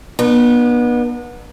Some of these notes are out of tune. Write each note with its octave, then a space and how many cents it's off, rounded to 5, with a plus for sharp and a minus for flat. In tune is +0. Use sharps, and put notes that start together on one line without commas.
B3 -30 D4 +40